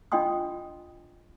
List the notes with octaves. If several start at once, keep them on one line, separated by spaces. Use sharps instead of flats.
D4 F4 D#5 G5 C6 D#6